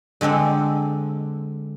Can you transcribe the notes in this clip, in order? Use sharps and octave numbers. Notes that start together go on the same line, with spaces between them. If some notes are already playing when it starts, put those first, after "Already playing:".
D3 G#3 C4 D4 A4